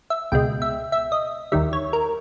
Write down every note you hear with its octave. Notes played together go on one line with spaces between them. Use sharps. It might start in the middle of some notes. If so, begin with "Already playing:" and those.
E5
C#2 B2 G#3 G5
E5
E5
D#5
D#2 D#3 G3 E5
C#5
A#4